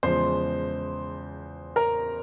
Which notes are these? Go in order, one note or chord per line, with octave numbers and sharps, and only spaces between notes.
E2 C#3 F3 G#3 C5 C6
A#4 A#5